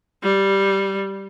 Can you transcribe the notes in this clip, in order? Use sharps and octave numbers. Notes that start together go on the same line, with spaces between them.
G3